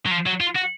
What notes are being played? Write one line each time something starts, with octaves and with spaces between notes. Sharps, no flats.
F#3
F3
F#3
F4
F#4